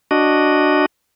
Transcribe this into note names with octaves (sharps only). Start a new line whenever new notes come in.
D4 F#4 D#5